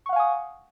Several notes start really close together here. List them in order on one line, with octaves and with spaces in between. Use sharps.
C#6 F#5 F5 G#5 D#6